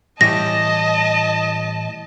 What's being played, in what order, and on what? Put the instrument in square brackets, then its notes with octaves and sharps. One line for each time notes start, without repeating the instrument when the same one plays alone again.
[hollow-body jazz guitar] A2 E3 G3 [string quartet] D#5 A5 [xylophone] A#6